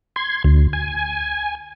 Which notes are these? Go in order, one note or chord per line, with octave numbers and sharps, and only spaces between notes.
C6 G#6
D2
G#5